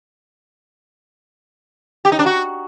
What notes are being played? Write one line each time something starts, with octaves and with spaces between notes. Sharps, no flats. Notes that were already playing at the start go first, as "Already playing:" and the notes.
G4
D#4
D4
F#4